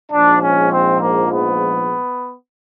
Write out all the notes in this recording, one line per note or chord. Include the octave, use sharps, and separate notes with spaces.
A#1 G#2 F3 G#3 D4
C#4
C4
A#3
B3